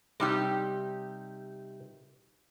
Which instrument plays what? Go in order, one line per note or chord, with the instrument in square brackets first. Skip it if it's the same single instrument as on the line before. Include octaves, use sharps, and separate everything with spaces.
[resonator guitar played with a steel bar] C3 D#4 G4 [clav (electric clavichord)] G3